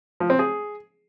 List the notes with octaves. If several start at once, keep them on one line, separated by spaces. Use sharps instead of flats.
F3
C4
G#4